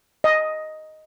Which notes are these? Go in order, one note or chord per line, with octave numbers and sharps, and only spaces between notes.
D#5